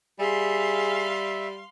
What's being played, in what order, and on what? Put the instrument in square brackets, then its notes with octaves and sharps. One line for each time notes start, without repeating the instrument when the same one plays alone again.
[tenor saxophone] G3 [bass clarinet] G#4 [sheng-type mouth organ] E5 [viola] F5 C6